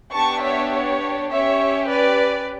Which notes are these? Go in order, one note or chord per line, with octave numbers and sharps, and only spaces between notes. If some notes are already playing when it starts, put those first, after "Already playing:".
B3 D4 G4 A5 C#6
C#5 E5
C#5
C#4 G4 C#5 E5
B4 D5